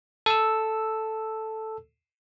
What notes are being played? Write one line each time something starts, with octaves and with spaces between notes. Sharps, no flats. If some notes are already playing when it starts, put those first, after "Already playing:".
A4 E6